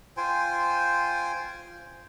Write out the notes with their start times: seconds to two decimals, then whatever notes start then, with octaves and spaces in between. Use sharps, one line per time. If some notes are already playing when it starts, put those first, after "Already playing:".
0.17 F4 C5 G5 G#5